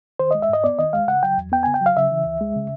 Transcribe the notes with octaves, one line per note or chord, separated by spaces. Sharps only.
D#3 C5
G#3 D#5
E5
G#2 D#5
B3 D5
D#3 D#5
G#3 F5
C#3 F#5
F#3 G5
E2
B3 G5
C#3 G#5
G5
F#3 F5
C#3 E5
E3
C#2
G#3
C#3